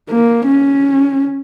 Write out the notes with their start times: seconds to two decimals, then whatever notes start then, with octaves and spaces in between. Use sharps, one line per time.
0.10 A#3
0.47 C#4